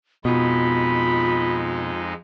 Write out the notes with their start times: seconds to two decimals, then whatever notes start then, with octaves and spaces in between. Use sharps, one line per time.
0.25 F2 B2 G#3 D#4 F4 B5